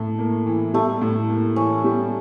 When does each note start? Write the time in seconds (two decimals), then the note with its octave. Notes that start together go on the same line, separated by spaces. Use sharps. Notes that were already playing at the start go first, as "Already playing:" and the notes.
Already playing: A2 A3
0.19 A#3
0.46 E3
0.74 G3 A3
1.02 A2
1.29 A#3
1.56 E3 C#4
1.84 G3